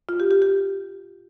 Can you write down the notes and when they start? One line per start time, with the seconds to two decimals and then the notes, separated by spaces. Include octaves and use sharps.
0.09 F4
0.20 G4
0.31 G4
0.42 G4